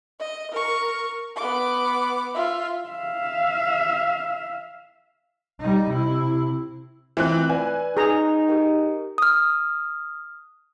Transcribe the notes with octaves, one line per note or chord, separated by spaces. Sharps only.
D#5
A#4 C#6
B3 D6
F4 E5
E5 F5
G3 D#4
C3 E4
E3 A3 C4 F4 F#6
B4 D5 E5 G#5
D#4 G#4 A#5 C#6 G6
G4 A#4 G5
D#6 F6